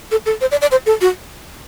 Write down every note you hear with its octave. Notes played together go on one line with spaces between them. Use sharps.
A4
A4
C5
D5
D5
C5
A4
F#4